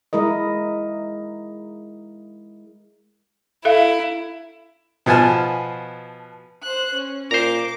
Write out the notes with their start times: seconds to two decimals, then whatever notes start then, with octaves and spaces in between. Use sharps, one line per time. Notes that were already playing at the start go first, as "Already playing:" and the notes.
0.13 G#3 E4 A#4 D#5
3.65 E4 A4 E5 F5
5.06 B2 F3 B3 G#5 A5 F6
6.63 C5 F#6
6.94 C#4
7.31 A#2 C5 A#5 D6